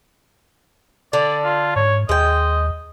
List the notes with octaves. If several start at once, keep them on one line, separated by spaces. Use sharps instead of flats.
D3 D5
F4
G#2 C#5
D#2 G#3 D#5 G5